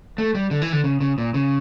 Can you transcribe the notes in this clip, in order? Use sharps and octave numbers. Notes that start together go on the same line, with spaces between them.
A3
G3
D3
E3
D3
C#3
C#3
A#2
C#3